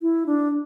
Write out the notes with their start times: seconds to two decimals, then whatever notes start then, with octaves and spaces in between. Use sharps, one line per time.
0.02 E4
0.26 D4